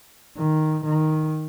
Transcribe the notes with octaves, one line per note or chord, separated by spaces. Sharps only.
D#3
D#3